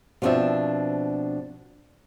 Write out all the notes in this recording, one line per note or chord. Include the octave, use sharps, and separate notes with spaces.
B2 F3 G#3 C4 D4 E5